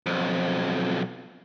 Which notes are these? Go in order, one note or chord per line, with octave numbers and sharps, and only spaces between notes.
B1 F2